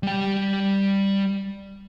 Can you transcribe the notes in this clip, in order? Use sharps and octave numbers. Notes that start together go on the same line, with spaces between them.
G3 G5